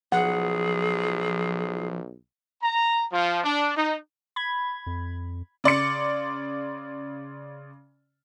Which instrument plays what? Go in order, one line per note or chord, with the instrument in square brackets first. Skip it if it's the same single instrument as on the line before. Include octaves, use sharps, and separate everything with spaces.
[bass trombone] B1 [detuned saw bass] F3 [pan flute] G#4 [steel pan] F#5
[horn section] A#5
F3
D4
D#4
[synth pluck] B5 G#6
[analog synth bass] F2
[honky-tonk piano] C#3 D5 C6 C#7